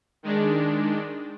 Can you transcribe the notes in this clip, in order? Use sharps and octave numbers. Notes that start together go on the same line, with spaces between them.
D#3 G#3 D4